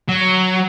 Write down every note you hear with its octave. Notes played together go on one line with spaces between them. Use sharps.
F#3